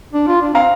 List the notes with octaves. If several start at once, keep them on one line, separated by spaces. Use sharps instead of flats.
D4
F4
D4
C4 F5 A#5